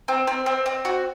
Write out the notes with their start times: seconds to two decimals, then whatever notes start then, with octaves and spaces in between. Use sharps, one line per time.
0.08 C4
0.27 C4
0.46 C4
0.66 C4
0.85 F#4